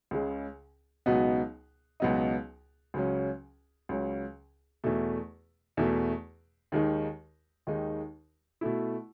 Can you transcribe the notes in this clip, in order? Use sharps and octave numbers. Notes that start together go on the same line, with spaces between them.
C#2 C#3 G#3 C#4
C#2 B2 F#3 B3 D#4
C#2 B2 F#3 B3 D#4
C#2 C#3 F#3 C#4
C#2 C#3 F#3 C#4
E2 B2 A3
E2 B2 A3
D#2 D#3 G#3 D#4
D#2 D#3 G#3 D#4
B2 A3 E4